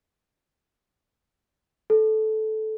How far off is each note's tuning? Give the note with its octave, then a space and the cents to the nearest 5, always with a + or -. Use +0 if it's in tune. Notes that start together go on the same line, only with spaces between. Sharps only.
A4 -15